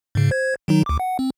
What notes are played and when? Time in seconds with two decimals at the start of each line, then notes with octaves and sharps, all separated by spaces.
0.15 G#2 C#3
0.31 C5 G#6
0.68 D#3 F#3 D#4
0.86 D2 D6
1.00 F#5
1.19 C4